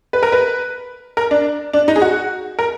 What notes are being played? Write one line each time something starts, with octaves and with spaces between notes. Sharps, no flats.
B4
A#4
B4
A#4
D4
D4
D#4
G#4
F#4
A#4